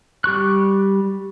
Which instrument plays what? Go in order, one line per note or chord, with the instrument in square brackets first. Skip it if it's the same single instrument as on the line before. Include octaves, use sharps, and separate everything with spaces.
[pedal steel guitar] G3 G4 C#6 F#6